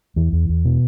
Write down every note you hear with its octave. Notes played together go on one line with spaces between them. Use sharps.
E2 E3
E2
E2
B2